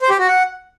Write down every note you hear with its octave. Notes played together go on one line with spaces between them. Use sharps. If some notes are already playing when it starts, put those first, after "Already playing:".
C5
G4
F#4
F#5